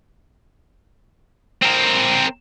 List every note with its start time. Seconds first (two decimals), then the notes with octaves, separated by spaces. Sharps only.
1.62 C4 A#4